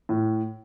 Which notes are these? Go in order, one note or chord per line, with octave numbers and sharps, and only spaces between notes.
A2